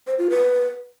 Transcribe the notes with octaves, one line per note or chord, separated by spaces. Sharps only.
C5
F4
B4